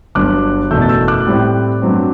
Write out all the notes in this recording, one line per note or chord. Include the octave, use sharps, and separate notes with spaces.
G1 G2 F#3 D6 F#6
F#1 E2 B2 A3 E6 G6
A6
E6 G6
D6 F#6
A2 G3 C4 E4
G2 F#3 C4